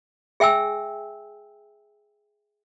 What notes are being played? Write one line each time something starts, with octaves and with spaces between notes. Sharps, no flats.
G#4 E5 G5 G#5 E6